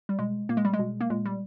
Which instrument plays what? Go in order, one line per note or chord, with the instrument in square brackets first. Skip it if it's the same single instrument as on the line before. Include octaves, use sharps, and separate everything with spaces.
[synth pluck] G3
B2 G#3
A#2 A#3
G#3
G3
G#3
B2
A#3
A#2 G#3
G3